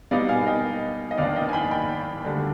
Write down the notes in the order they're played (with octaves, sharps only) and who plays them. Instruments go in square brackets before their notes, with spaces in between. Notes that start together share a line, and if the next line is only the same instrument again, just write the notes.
[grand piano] B2 G3 B3 D#4 [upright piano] D5 F5
[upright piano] F5 G#5
D#5 G5
D#5
[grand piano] D#2 D#3 B3 D4 [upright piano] D5 F5
[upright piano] D#5 G5
G#5
G5 B5
G5 B5
[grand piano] D2 D3 G3 D4